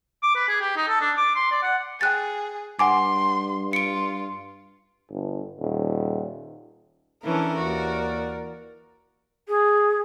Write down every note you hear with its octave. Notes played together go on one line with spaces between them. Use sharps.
D6
B4
G#4
G4
D#4
A4
D4
D6
C6
D5
F#5
G#4 G5 F#6 A6
G2 F#5 G#5 C6 D6
F4 C#7 D7
G1
D#1
E3 C#4 D4 A4 A#4
D#2 F#4 D5
G#4